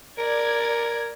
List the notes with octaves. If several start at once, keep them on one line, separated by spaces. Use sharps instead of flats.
A#4 D5 G#6